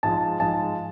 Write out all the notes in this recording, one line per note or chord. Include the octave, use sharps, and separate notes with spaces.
G#2 F3 G#3 A5
G#2 F3 G#3 A5